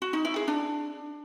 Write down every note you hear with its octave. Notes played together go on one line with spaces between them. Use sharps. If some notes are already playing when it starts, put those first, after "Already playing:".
F#4
D#4
E4
G#4
D4